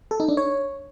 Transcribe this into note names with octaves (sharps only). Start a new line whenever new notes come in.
A4
D#4
D4
C#5